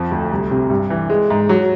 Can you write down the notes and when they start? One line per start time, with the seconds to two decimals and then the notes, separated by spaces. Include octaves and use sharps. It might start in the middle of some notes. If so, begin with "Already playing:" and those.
Already playing: F2 F3
0.11 D2
0.32 C2
0.51 C3
0.70 G2
0.90 E3
1.10 G#3
1.30 G#2
1.49 F#3